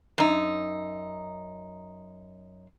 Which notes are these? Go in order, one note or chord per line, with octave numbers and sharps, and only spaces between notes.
F#2 D#4